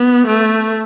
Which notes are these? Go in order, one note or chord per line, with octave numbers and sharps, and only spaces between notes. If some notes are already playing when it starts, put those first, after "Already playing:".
Already playing: B3
A3